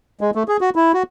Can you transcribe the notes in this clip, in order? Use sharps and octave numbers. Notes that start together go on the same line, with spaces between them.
G#3
A3
G#4
F#4
E4
F#4